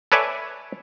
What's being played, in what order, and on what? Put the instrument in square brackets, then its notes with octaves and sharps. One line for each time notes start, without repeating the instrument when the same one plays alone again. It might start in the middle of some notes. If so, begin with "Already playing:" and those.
[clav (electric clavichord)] A4 B4 C#5 D5 E5 G#5